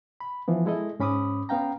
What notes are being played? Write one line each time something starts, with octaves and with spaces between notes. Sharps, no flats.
B5
E3 F3 B3
G#3 E4 A4 D#5
G#2 C#4 B5 D6 D#6
B3 C#4 F5 G5 A#5